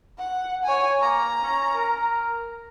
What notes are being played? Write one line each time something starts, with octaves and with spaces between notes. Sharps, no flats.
F#5
C#5 G#5
A#3 A#5
C#4
A#4